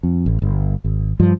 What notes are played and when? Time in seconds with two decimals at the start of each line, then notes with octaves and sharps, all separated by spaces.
0.03 F2
0.26 A1
0.42 G1
0.84 G#1
1.20 G2 F3